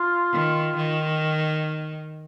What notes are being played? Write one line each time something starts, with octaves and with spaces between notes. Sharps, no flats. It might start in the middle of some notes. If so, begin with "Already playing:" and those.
Already playing: F4
D#3
D#3